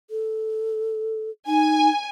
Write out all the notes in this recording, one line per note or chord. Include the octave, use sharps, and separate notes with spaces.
A4
D#4 G#5